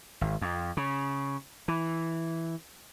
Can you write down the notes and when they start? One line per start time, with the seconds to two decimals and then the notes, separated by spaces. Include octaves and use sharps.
0.21 G#1
0.41 F2
0.77 C#3
1.68 E3